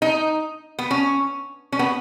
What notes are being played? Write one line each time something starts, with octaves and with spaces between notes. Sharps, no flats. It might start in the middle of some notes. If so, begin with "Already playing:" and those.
D#4
B3
C#4
C#4
B3